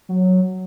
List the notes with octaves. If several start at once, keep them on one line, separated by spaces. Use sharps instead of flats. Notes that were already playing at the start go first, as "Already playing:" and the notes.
F#3